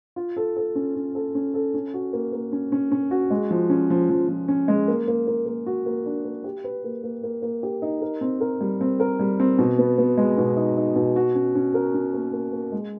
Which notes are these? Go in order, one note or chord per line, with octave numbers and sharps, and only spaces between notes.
F4
A4
A4
C#4
C#4
A4
C#4
A4
C#4
F#4
A#3
A#3
C#4
C#4
C#4
F#4
G#3
F3
C#4
F3
F3
F3
C#4
G#3
A#3
A#3
A#3
A#3
F#4
A#3
D4
A#3
G4
B4
A#3
A#3
A#3
A#3
G4
D#4
A#4
C4
A#4
G3
C4
A#4
G3
C4
B2
B3
B3
G#3
B2
D#4
D#4
B2
F#4
C#4
C#4
A#4
C#4
A#3
A#3
A#3
G#3